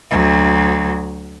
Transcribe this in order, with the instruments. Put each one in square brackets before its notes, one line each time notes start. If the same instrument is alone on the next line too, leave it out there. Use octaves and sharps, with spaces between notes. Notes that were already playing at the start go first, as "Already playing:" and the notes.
[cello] D2 F#3